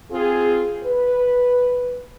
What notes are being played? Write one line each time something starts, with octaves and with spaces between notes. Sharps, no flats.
C4 F4 G#4
B4